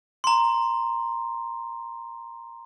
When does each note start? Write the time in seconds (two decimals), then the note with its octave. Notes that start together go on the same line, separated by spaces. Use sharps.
0.24 A#5 C6